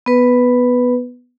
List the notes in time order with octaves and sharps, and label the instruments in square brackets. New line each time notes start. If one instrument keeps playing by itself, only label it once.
[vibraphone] B3 B4